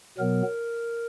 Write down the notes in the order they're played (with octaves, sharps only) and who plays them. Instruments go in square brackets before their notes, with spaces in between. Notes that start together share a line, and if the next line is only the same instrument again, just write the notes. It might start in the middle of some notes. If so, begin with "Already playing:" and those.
[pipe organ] B2 F#3 B3 A#4